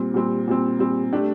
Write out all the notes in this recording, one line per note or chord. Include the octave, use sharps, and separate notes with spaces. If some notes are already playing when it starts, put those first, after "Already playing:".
Already playing: A#2 G3 C4
A#2 G3 C4
A#2 G3 C4
A#2 G3 C4
A3 D4 G4